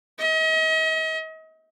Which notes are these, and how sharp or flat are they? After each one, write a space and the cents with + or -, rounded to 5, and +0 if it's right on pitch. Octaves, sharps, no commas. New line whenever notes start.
D#5 +40